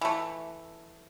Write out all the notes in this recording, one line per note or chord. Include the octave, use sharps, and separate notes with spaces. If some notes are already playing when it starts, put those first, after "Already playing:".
E3 A3